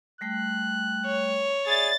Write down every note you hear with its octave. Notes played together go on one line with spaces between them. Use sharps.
G3 A3 G5 F#6
C#5
G#4 D5 E5 B5 A6